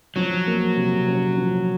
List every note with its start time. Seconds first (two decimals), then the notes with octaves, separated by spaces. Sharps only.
0.16 F3 F#3
0.47 A#3
0.77 C3
1.08 C#4
1.38 F3